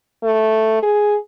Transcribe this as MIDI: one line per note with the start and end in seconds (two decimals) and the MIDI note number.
0.24 0.79 57
0.83 1.16 68